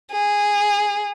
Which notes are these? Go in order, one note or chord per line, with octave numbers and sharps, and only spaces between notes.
G#4